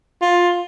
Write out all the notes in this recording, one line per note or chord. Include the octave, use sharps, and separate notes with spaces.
F4